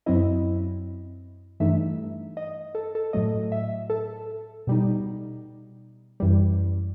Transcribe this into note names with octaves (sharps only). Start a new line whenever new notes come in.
F#2 F#3 C4 E4 D#5
G2 E3 A3 D#4 E5
D#5
A4
A4
A2 F#3 A3 D#5
E5
A4
B2 G3 D#4
F#2 E3 G3